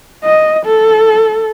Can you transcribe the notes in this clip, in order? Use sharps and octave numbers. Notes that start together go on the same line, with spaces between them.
D#5
A4